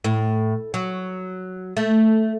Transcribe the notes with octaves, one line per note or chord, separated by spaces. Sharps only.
A2
F#3
A3